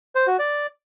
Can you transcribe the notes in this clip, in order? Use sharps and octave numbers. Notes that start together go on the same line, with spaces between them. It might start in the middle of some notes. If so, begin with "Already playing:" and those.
C5
F#4
D5